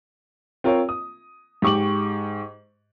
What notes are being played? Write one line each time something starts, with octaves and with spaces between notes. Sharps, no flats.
C4 F4 A#4 C#5
D#6
G#2 G4 C#6 D6 F#7